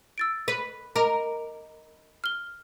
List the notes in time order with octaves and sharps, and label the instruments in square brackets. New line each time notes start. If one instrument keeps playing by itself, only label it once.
[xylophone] E6 A6 D7
[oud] B4 [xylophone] D#7
[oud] A#4 [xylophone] D#5 D6
[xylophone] F6 G7